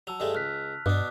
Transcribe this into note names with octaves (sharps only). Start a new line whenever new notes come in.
F#3 A5 E6 F7
G2 G#3 A3
C#2 F6 F#6 B6
G2 B2 D4 D6 D#6 F#6